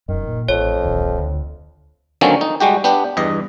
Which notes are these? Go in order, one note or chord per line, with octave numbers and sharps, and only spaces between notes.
F1 F#2 D#3
A#2
A1 F2 C#5
D1 A#1 D#2
D2
D3 D#3 F#3 A#3 C4 C#4
D#4
G3 G#3 F#4 G4
B3 D4 G4
E2 G2 D#5